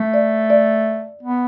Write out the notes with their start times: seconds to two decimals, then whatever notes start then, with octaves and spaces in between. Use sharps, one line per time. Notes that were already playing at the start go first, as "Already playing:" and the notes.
Already playing: A3
0.14 D5
0.50 D5
1.23 B3